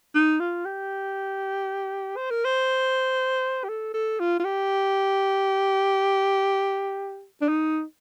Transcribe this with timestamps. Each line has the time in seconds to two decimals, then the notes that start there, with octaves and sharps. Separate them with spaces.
0.15 D#4
0.40 F4
0.66 G4
2.17 C5
2.30 A#4
2.45 C5
3.64 G4
3.69 A4
3.94 A4
4.20 F4
4.40 F4
4.45 G4
7.42 D4
7.48 D#4